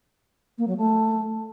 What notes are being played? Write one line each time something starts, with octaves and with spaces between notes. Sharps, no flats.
A#3
F#3
A3